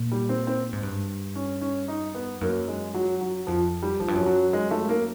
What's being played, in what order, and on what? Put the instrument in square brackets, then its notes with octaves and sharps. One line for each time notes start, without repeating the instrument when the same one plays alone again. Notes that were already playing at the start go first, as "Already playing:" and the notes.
Already playing: [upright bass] A#2
[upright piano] G3
C4
C4
[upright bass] G#2
G2
[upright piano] C#4
C#4
D#4
B3
[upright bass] F#2 [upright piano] A#3
[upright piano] G#3
F#3
F#3
[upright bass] F2 [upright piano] F3
[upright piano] G3
[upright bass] F#2 [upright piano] F3
[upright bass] G2
F#2
[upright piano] F#3
G#3
A3
A#3